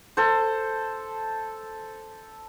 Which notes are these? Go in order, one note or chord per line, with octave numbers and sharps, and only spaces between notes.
A4 C5